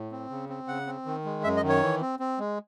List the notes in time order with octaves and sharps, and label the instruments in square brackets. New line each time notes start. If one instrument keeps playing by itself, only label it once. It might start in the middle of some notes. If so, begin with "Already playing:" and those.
Already playing: [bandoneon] A2
C4
C#3
C4
C#3 F#5
C4
D#3
G#3
F#2 E5
D#5
D#3
C#5
E3
C4
C4
G#3